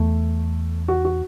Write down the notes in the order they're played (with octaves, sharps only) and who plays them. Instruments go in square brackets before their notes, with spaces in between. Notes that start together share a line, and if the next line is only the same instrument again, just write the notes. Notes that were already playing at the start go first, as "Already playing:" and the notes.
Already playing: [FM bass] E2 [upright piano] A3
[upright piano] F#4
F#4